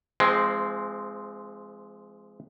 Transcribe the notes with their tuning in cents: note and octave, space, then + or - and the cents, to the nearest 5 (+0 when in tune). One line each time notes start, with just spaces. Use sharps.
F3 -35 G#3 +0 C4 -5